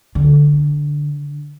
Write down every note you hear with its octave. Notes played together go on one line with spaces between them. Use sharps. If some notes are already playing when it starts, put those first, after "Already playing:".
D3